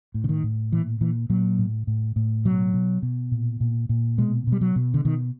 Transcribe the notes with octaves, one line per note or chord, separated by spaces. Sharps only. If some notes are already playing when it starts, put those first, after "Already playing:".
A2
D3
D#3
A2
A#2 E3
A#2 E3
A#2 F#3
A2
A2
A2
B2 F#3
B2
B2
A#2
A#2
A#2
B2 G#3
B2
G3
F#3
B2
D3
B2 D#3